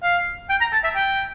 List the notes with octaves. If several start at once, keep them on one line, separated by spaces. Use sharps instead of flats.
F5
G5
A#5
A5
E5
G5